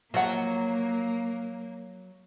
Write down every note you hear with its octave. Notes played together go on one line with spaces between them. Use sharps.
F3 F#3 A#3 F#5